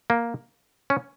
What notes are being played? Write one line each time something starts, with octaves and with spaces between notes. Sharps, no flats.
A#3
C#4